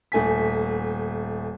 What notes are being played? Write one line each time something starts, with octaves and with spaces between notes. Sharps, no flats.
D#1 A3 G#5 B6